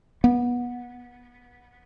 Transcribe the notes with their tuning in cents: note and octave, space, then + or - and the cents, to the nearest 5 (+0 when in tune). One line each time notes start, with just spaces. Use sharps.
B3 -20